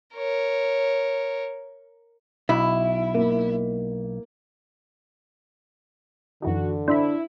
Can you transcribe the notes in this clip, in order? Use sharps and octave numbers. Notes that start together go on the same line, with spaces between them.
A#4 C#5
B1 E4
A#3
F#2 D3 E3 D#4 F#4
D4 E4 C5 E5 B5